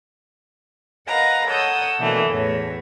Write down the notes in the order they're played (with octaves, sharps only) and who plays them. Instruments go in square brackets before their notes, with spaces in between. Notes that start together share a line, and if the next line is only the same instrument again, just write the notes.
[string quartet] A#4 B4 D#5 F5 F#5 A#5
A4 C#5 F#5 D#6 E6 G6
B2 D3 E3 A3 A#3
E2 A2 C#5